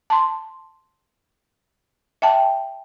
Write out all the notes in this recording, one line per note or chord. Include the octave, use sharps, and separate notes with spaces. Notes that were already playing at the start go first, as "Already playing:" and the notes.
A5 C6
E5 G5 A5